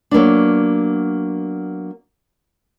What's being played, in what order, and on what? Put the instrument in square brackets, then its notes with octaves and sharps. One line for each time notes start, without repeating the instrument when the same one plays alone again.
[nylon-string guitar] F#3 A#3 B3 D4